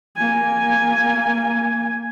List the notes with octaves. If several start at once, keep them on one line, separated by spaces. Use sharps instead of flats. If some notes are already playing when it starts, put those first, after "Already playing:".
A#3 G#5